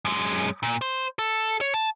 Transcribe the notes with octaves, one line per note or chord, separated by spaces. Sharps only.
F#2 G#3
A#2
C5
A4
C#5
A5